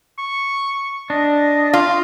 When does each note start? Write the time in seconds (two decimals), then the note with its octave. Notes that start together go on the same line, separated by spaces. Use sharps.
0.18 C#6
1.10 D4 D#5
1.73 F4 F5